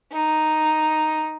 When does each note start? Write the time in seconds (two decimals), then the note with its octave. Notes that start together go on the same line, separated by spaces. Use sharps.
0.13 D#4